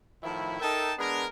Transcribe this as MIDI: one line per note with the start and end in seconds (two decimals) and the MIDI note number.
0.23 0.60 45
0.23 0.60 51
0.23 0.60 53
0.23 0.60 64
0.60 0.92 63
0.60 0.92 69
0.60 0.92 70
0.60 0.92 76
0.60 0.92 79
0.60 0.92 81
0.98 1.25 56
0.98 1.25 59
0.98 1.25 62
0.98 1.25 68
0.98 1.25 70